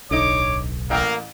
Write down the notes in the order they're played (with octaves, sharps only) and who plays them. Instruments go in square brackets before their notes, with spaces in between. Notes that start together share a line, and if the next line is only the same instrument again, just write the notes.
[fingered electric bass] D1 B1 [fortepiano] D3 D#4 [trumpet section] C#5 D6
[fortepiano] A1 G5 E6 [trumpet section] A#3